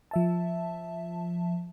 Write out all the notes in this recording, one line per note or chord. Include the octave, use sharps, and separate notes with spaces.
F3 E5 A5